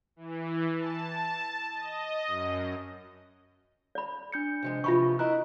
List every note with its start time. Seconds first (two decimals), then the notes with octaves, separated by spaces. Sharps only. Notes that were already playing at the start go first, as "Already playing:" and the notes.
0.16 E3
0.75 A5
1.74 D#5
2.27 F#2
3.95 D5 B5
4.32 D4 G6 C#7
4.62 C3 F3 G#3
4.84 C3 E3 F3 F4 B5 C#6
5.19 E4 A#4 D#5 A#5 F#6